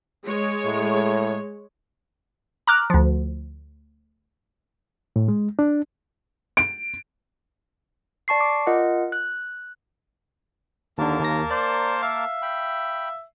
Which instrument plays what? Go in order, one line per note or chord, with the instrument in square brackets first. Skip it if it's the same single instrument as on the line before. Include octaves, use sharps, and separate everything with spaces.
[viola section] G#3 C#5
[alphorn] A2
[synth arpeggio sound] A#5 D6 F6 F#6
D2 F3
[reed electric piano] A2
G#3
D4
[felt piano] D7
[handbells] D5 A5 C#6 C7
D6
F4 A#4 D#5 F#5
F#6
[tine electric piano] D#2 D3 [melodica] A#3 A#4 A5
[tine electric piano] D#2 A#6
[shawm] C5 [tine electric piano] D5
[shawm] E5 [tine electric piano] F5
[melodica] G5 B5